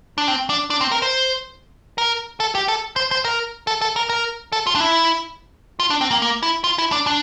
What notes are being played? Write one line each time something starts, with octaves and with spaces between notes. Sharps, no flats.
D4
C4
D4
D4
C4
A#4
C5
A#4
A4
G4
A4
C5
C5
A#4
A4
A4
A#4
A#4
A4
F4
D4
E4
F4
D4
C4
A#3
A#3
E4
F4
E4
D4
D4